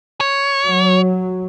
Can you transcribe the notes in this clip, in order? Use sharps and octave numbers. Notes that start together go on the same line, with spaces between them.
C#5
F#3